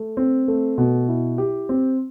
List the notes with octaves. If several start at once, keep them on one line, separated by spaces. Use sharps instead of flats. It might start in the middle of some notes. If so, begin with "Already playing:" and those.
Already playing: A3
C4
A3
B2
E4
G4
C4